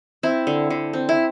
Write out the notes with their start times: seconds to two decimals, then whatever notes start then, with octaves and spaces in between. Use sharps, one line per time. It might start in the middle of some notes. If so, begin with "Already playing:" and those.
0.23 C4 E4
0.47 D3
0.70 D3
0.93 C4
1.09 E4